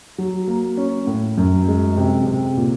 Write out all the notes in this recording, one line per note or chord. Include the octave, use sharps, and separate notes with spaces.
F#3
A#3
C#4
A2
F#2
G#3
C3
C3
A#2